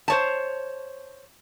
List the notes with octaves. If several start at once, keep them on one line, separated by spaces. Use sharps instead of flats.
C5 C#5 A5